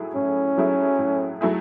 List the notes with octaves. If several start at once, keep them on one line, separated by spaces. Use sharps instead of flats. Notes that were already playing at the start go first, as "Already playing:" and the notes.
Already playing: A2 F#3 A3 E4 G#4
A2 C#4
F#3 A3 E4 G#4
A2
F#3 A3 E4 G#4